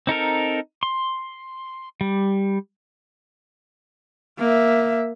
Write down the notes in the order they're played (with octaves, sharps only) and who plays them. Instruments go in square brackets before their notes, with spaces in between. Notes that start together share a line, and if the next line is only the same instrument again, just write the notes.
[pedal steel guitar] C4 D#4 A4 A#4
C6
G3
[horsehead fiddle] A#3 E5